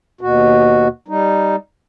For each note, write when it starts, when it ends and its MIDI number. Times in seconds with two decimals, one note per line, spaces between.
0.21 0.88 39
0.21 0.88 47
0.21 0.88 66
1.08 1.56 55
1.08 1.56 63